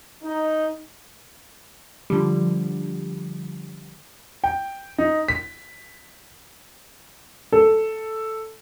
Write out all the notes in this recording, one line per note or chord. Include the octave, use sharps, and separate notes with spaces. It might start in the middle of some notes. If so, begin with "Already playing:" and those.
D#4
D3 F3 G3
G5
D#4
B6
A4